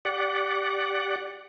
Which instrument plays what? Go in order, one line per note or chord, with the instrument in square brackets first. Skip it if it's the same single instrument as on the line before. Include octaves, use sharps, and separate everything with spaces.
[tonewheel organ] G4 D5 F#5